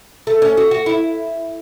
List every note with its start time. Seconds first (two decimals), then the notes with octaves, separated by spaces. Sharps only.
0.27 A3
0.42 C#4
0.57 F#4
0.71 F#4
0.86 E4